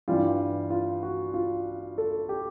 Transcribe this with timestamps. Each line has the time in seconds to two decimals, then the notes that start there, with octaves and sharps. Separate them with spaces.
0.08 G2 E3 G3 F4
0.70 F4
1.03 F#4
1.34 F4
1.98 A4
2.29 G4